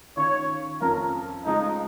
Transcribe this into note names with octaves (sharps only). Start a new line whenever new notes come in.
D#3 C#4 F4 C#5
F2 F3 C#4 F4 A#4
C#3 F3 G#3 D#4